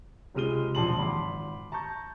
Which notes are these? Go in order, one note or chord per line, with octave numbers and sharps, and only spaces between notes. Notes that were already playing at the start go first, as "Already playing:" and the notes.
C#2 C3 G#3 F6 D#7 G7
E1 A#1 A5 C6 F#7
G#1 B5 C6 D6
A5 A#5 C#6 G6